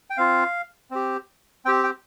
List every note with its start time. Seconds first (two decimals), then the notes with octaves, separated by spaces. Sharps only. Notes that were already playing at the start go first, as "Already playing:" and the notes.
0.10 G5
0.17 C4 F4 F5
0.91 C4 G4
1.65 C4 G5
1.68 G4
1.84 G5